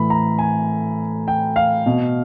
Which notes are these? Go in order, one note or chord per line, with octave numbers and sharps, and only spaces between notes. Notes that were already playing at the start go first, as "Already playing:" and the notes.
Already playing: A2 E3 B5
A#5
G#5
G5
F5
B2